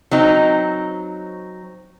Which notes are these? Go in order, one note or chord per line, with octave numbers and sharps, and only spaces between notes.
F#3 C4 D#4